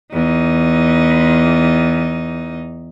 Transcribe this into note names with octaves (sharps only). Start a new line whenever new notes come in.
E2 D#4